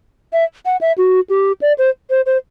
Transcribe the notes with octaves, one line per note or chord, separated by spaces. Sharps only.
E5
F#5
E5
F#4
G4
D5
C5
C5
C5